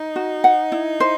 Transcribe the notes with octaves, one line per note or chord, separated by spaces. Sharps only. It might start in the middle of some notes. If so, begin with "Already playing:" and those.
Already playing: D#4
F#4
F#5
E4
C5